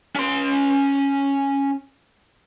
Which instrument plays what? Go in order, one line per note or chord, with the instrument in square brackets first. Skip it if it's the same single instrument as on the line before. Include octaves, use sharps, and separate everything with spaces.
[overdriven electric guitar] C#4 C6